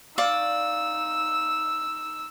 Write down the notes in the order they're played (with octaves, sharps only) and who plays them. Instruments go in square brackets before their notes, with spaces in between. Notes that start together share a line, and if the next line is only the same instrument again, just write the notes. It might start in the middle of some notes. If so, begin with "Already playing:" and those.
[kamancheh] D#4 E6 [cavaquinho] D5 F5 C#6